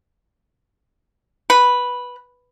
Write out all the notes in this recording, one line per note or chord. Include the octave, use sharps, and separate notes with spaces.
B4